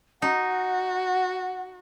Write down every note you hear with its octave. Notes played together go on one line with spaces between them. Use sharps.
D#4 F#4 F#5